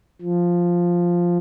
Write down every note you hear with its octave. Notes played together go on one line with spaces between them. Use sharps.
F3